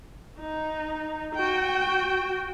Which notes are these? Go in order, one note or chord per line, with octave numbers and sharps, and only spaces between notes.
D#4
F#4 G5